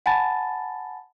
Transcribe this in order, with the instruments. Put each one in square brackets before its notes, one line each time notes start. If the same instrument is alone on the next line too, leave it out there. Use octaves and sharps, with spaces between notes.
[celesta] F#5 G#5 A5 B5 A6